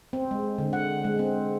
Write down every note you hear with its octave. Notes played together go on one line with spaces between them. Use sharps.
C4
G#3
D3
F#5
G#3
C4